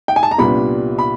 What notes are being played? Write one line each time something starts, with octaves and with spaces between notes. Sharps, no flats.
G5
G#5
A5
A#5
C2 A#2 G3 B3 D4 B5
B5